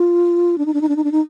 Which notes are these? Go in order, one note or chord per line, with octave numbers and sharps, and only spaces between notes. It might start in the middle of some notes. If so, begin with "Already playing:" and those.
Already playing: F4
D4
D#4
D4
D#4
D4
D#4
D4
D#4